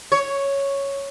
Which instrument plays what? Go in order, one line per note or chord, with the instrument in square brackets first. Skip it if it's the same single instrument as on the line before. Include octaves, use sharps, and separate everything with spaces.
[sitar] C#5